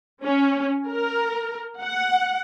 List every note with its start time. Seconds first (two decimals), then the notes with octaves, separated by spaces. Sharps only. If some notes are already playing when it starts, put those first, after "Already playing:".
0.25 C#4
0.90 A#4
1.80 F#5